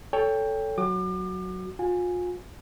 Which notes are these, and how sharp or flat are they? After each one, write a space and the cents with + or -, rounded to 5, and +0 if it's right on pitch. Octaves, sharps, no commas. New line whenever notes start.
A4 +0 C#5 +20 G5 +20
F#3 +0 F#4 +0 D6 +40
F4 +40 G#5 -10